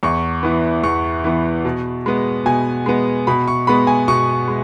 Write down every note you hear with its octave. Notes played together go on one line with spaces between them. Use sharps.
E2 C#6
E3 B3
E2 C#6
E3 B3
B2
G#3 B3
B2 G#5
G#3 B3
B2 B5
C#6
G#3 B3 B5
G#5
B2 C#6
G#3